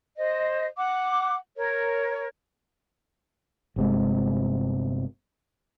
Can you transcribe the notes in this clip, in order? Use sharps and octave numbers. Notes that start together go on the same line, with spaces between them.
C5 D#5
F#5 D6
A#4 C#5
G1 C3 G#3